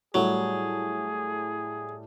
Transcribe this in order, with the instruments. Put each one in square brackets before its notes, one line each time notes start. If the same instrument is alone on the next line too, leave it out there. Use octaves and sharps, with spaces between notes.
[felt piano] A2 G3 A3 [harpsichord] F#3 [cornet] G#4